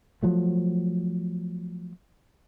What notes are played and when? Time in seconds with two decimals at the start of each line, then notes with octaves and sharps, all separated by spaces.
0.23 F3 F#3 A3